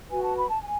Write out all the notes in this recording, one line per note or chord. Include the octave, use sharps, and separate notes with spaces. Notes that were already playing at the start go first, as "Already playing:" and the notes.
F#4 B4 G#5
A5
B5
A5
G#5